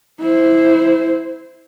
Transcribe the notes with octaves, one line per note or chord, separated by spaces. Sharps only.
E4 C5